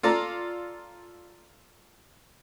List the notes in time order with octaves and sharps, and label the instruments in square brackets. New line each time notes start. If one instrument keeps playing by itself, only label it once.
[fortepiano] F4 A4 D5 A#5